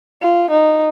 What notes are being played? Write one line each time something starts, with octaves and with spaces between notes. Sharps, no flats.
F4
D#4